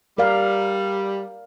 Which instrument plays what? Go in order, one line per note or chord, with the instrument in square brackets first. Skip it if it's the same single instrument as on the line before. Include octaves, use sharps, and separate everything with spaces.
[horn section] G3 [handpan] A#4 D5 F5